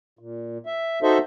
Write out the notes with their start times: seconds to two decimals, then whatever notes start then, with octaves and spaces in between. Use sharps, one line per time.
0.19 A#2
0.66 E5
1.03 D#4 F#4 A4 C5 D#5 E5